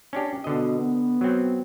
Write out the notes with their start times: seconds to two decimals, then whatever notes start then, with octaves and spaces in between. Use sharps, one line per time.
0.13 C#4 D4 G4
0.44 B2 D3 D#5
0.80 B3
1.21 F#3 C4